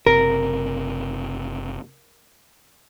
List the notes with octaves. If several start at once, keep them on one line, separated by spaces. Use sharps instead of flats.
F#1 C3 A#4